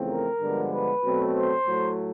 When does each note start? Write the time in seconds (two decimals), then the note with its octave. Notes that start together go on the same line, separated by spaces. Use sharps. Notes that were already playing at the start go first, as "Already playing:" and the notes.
Already playing: E2 C#3 F3 A3 C4
0.09 A#4
0.41 G2 D3 F3 G#3 B3
0.72 B4
1.04 B2 F#3 A3 C4
1.35 C5
1.67 A2 F#3 A3